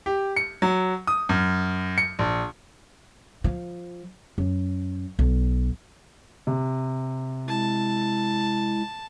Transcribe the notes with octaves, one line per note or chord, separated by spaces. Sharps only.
G4
C#7
F#3
D#6
F#2
C#7
A#1
F3
F#2
B1
C3
G#3 E4 A5